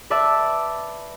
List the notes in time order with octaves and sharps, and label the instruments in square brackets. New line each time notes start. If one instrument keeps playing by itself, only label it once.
[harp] B4 D5 E5 A5 E6